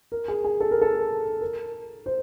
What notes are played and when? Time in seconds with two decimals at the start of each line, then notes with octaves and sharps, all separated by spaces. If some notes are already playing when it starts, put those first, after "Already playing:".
0.12 A#4
0.28 G#4
0.44 G#4
0.60 A4
0.71 A#4
0.81 A4
1.41 A#4
2.06 C5